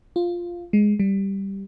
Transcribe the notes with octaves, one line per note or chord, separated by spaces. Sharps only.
F4
G#3
G3